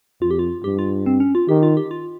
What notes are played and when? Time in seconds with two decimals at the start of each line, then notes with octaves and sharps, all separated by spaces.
0.22 F2 F4
0.31 G4
0.39 F4
0.64 G2 G4
0.79 F4
1.06 C4
1.20 C#4
1.35 F4
1.49 D#3 G4
1.63 F4
1.77 G4
1.91 F4